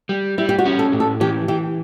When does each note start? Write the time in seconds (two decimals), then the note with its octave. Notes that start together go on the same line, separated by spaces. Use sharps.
0.09 G3
0.38 G3 E4
0.49 G4
0.59 F#4
0.66 C#4
0.79 A4
0.93 A2
1.00 A4
1.20 E3 G4
1.48 E3 G4